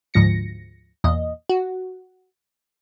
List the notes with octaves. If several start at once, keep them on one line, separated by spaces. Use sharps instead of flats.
D2 G#2 F3 A#6 C#7
E2 A#2 D#5
F#4